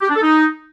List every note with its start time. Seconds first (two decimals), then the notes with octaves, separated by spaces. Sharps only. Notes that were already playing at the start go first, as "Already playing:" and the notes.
0.02 G4
0.08 D4
0.15 A4
0.21 D#4